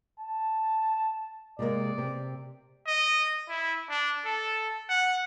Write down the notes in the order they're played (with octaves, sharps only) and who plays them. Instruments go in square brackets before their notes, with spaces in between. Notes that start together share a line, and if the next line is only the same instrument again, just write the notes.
[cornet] A5
[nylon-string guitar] C3 G#3 A#3 [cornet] D5
[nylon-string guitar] C3 C4
[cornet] D#5
E4
D4
A4
F#5